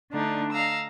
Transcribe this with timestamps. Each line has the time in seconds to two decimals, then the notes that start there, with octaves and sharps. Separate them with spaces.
0.11 D3 A3 D4 D#4
0.52 D#5 F5 A#5 E6